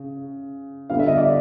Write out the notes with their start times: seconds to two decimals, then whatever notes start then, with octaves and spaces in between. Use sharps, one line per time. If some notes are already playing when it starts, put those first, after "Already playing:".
Already playing: C#3
0.90 D3 G3 B3 D4 F5
0.99 E5
1.08 D#5
1.17 D5 E5